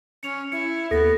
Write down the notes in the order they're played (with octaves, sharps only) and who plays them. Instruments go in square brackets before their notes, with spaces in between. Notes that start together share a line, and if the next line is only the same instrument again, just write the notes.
[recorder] C#4 [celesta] C#7 F7
[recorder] E4 [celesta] C#7
[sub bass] D#2 [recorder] B3 [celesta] A4 A#6